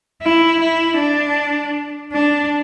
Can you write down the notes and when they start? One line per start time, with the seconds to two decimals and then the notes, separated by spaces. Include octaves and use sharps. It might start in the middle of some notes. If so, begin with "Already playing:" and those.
0.22 E4
0.60 E4
0.98 D4
2.12 D4